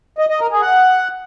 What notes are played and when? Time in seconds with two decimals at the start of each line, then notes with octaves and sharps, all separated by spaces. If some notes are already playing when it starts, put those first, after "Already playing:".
0.18 D#5
0.29 D#5
0.40 A#4
0.51 G#4
0.62 F#5